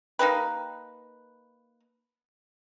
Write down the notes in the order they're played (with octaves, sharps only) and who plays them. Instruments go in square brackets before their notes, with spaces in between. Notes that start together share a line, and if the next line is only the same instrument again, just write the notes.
[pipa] A#3 D#4 G4 B4